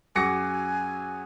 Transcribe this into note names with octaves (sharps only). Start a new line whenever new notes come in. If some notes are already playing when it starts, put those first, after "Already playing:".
F#2 F#4 G#4 G#5 D6 A#6 C#7